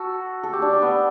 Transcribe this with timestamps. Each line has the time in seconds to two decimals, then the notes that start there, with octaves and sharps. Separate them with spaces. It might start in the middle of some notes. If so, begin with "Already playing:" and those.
Already playing: F#4 A4
0.43 A4
0.53 G4
0.62 D4
0.73 D4
0.82 B3